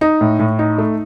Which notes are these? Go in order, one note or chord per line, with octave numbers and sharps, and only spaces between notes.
D#4
A2
A2
D#4
A3